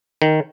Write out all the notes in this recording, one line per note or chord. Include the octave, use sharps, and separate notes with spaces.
D#3